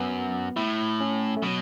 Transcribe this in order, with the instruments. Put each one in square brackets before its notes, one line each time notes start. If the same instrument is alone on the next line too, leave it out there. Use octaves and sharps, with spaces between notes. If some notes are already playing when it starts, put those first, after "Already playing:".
Already playing: [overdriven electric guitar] F#2 [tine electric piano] B3
[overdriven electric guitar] A2 [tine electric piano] E4
[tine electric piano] C#4
A3
[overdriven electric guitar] B2 [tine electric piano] F#3